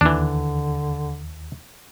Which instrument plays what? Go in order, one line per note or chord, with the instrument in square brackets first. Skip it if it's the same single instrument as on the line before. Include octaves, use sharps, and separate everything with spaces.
[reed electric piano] D#2 [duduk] D3 [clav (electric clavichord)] E3 D4